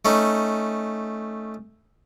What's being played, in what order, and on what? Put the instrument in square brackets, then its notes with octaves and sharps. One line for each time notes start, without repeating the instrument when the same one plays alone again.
[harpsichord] A3 C#4 D#4